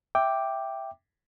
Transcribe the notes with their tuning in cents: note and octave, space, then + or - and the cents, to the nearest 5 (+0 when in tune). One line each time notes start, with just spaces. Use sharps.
E5 +0 G5 +0 D6 +0